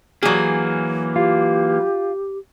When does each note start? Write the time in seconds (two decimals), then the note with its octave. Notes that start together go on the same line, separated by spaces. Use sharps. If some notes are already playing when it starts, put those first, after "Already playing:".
0.23 E3 F#3 A#3 G#4
1.16 F4 G4